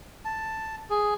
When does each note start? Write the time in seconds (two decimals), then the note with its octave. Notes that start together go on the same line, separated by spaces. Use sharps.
0.25 A5
0.90 G#4